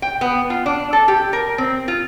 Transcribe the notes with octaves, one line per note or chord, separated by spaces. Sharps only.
G5
B3
F4
D4
A4
G4
A#4
C4
F4